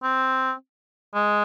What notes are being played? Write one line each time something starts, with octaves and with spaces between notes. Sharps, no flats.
C4
G#3